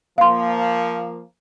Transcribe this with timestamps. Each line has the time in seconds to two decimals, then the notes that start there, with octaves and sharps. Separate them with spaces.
0.18 F3 A#3 F5 C6